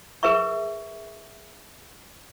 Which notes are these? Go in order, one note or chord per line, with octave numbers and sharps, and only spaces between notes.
G#4 A#4 B4 E5 C#6